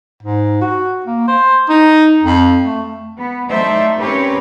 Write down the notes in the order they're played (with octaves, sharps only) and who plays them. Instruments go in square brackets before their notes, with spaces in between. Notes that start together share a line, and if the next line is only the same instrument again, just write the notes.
[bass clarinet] G#2
F#4
A#3
C5
D#4
F2
A3
[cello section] B3
F#3 A3 D#4 C5 D5 E5
C4 C#4 G4 A#4 B4 C#5